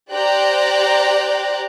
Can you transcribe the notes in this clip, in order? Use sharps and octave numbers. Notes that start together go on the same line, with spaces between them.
G4 C5 D5 G5 A#5 F#6